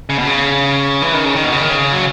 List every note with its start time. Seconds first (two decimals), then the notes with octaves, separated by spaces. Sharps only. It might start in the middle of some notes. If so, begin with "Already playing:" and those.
0.09 C#3
0.18 B2
0.27 C#3
1.02 E3
1.13 D#3
1.24 C#3
1.35 D#3
1.44 B2
1.52 C#3
1.61 D#3
1.69 C#3
1.93 F#3